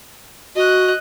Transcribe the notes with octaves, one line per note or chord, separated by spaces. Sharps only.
F#4 D#5 F#6